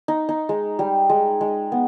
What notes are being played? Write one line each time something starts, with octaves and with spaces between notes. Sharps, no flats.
D#4
D#4
G#3
G3
G#3
G#3
B3